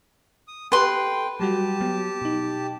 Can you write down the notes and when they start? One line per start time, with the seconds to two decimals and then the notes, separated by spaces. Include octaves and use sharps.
0.48 D#6
0.72 G4 A4 B4 G5 C6
1.40 F#3 G3 F#4 G4 A5
1.81 F#3 B3
2.22 B2 D#4